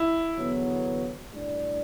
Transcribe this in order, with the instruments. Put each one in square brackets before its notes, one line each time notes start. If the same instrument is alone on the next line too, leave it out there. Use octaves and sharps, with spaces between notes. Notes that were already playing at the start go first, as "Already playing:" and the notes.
Already playing: [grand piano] E4
[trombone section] E2 D3 F#3 B3
A2 G3 D4